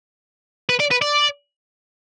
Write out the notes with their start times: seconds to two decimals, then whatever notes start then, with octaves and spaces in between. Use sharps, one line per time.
0.69 B4
0.80 D5
0.91 B4
1.02 D5